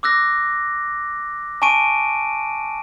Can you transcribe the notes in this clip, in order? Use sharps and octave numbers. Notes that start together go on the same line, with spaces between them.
D6 E6 F#6 A#6
G#5 A5 C#6 D7 D#7